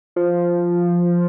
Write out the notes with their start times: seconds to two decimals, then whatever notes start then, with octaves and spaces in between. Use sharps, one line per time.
0.16 F3